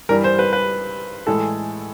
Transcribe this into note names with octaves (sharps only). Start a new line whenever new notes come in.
G2 E3 G3 A#4
C5
B4
B4
A2 E3 G#3 A4